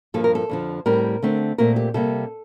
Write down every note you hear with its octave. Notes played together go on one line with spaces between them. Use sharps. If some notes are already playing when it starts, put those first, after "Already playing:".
G2 F3 A#3 A4
A#4
A4
F2 D3 F3
A2 G3 C4 A#4
D3 A3 C4
A#2 A3 C4 A#4
G4
C3 G3 A#3 A4